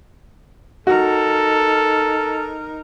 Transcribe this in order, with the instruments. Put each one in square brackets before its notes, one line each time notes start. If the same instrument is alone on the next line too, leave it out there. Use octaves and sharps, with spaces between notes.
[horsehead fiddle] D#4 A#4 [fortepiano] F#4 [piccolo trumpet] A4